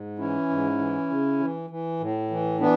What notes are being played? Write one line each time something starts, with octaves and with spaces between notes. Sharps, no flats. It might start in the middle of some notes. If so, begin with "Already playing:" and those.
Already playing: G#2
E3 C#4 E4
G#2
E3
C#3
E3
E3
A2
E3
E3 B3 D4